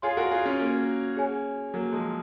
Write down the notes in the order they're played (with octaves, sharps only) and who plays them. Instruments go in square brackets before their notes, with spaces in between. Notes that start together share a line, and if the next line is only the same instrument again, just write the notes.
[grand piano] F4 G#4 [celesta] C#5 G#5 C6
[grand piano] F#4 A#4
F4 G#4
C#4 F4
A#3 C#4
[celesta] G#4 C#5 G#5
[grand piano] F#3 A#3
F3 G#3